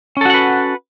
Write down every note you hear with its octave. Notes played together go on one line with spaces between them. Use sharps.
C#4 F#4 A4 B4 F#5